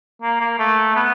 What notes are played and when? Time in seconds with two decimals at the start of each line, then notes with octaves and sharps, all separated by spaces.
0.22 A#3
0.41 A#3
0.59 A3
0.96 B3